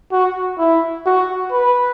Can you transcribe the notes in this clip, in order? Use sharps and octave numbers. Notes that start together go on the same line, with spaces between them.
F#4
E4
F#4
B4